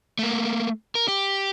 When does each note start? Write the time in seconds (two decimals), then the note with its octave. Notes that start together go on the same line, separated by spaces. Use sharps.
0.19 A3 A#3
0.95 A#4
1.08 G4